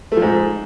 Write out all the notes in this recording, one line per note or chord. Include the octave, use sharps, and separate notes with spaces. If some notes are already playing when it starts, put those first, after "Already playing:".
A3
F3
G#2